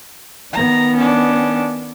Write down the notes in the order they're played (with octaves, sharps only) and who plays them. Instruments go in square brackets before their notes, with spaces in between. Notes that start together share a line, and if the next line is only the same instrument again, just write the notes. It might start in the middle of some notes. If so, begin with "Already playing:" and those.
[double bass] D#3 B3 [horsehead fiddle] A#5
[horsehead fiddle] C#4 D4